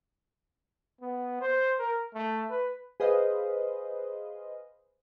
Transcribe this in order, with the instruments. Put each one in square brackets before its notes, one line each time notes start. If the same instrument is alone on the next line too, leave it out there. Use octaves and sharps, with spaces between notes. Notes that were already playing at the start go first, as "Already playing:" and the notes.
[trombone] B3
C5
A#4
A3
B4
[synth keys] G#4 B4 C5 D#5 F5